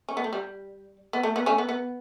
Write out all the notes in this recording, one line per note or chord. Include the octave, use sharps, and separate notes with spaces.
C#4
B3
A3
G3
B3
A3
B3
A3 C#4
B3
B3